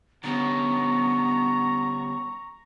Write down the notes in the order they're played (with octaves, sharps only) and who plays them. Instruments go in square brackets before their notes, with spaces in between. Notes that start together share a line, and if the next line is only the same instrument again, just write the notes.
[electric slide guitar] D3 G3 C#4 [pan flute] B3 [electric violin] A#5 [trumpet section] C#6